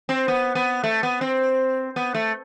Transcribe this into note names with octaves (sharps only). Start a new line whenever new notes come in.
C4
B3
B3
A3
B3
C4
B3
A3